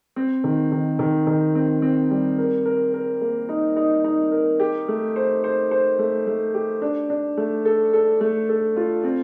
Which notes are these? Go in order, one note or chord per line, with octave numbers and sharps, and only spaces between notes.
C4
D#3
D#3
D#3
D#3
C4
C4
G3
A#4
A#4
A#4
A#3
D#4
D#4
D#4
A#4
G4
A3
C5
C5
C5
A3
A3
G4
D4
D4
A3
A4
A4
A3
A4
F4
C4